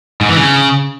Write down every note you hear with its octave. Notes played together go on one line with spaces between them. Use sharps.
G#2
E3
C#3